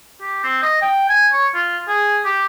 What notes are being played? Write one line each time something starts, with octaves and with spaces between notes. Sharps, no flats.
G4
C4
D#5
G5
G#5
C#5
F4
G#4
G4